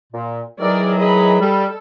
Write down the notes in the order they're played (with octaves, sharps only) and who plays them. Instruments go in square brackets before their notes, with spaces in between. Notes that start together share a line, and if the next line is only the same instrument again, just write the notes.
[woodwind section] A#2
[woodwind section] D#3 E3 F#3 [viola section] G#4 A#4 D5
[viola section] G#4 D#5 B5
[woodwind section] G3 [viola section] A4